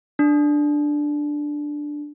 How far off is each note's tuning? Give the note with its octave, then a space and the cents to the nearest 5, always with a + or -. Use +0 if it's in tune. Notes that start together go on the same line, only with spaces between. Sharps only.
D4 +5